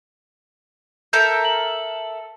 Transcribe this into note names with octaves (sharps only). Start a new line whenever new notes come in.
A4 A#4 E5 G6
F#7